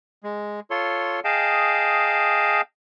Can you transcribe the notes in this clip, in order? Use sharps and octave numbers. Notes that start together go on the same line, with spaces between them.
G#3
F4 A4 C#5 C6
G#4 D#5 F5 G5 A5